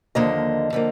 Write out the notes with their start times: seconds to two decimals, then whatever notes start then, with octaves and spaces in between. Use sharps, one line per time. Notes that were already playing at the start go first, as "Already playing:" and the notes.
0.15 D#2 D3 F3 A#3 D#5
0.73 D3 F3 A#3